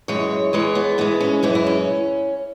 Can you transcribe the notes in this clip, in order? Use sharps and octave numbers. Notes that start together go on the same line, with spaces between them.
F#2 E3 G#3 C#5
E2 E3 G#3 C#5
B3
G#2 E3 G#3 B3
C#4
F#2 E3 G#3 C#4
E4
C#4